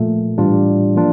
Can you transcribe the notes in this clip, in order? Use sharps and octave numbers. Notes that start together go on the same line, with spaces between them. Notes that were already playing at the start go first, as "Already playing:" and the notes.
Already playing: A#2 F3 A3
A2 E3 G3 D4 F4
F3 A#3 D4 F4